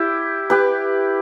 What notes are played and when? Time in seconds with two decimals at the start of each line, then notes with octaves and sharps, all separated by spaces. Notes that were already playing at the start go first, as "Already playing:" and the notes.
Already playing: E4 G4
0.50 G4 B4